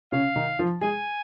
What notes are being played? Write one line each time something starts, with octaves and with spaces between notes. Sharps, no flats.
C#3 C#4 F5
D#3 D#4
F3 F4
G#3 G#4 G#5